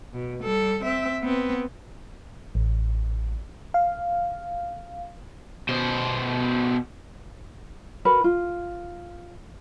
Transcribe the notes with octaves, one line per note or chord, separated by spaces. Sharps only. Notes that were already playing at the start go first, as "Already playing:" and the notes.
B2
G3 A4
C4 E5
B3 C4
A1
F5
B2 C5
F#4 A#4 B4
F4